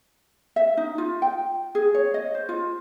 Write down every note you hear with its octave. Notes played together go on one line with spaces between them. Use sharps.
E5
D#4
F4
G5
G#4
C#5
D#5
C5
F4